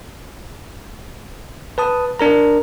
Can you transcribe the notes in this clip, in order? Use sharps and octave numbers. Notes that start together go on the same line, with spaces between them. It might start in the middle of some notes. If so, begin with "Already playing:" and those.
B4 A5 D#6
D4 A#4 A#5